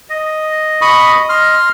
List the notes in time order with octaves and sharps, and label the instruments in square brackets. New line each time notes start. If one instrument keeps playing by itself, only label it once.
[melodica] D#5
[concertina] B5 C#6 D#6
C6 F6